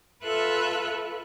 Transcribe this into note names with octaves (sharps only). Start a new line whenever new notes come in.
F4 A4 B4 E5 F#6